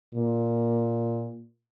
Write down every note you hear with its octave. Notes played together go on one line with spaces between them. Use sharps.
A#2